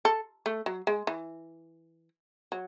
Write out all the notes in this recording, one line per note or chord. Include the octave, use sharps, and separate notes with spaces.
A4
A3
F#3
G#3
E3
F#3